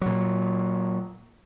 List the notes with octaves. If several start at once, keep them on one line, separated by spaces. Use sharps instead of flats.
A#2 F#3